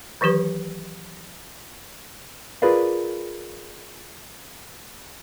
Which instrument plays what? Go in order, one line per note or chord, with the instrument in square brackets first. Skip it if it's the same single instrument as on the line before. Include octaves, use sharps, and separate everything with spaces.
[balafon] D#3 E3 F#3 G4 B4
[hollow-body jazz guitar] F4 G#4 A#4 B4 D5 F5